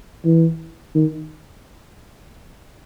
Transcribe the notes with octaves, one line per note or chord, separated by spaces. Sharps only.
E3
D#3